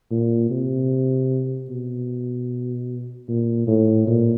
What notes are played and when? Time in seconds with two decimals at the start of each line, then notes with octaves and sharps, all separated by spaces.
0.11 A#2
0.50 C3
1.69 B2
3.28 A#2
3.67 A2
4.07 A#2